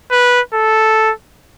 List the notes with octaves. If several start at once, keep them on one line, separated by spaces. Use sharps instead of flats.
B4
A4